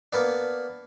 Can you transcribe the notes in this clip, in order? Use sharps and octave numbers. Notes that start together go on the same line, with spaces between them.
A#3 B3 D4